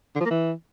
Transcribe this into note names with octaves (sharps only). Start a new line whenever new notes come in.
D3
F3
A#3
E3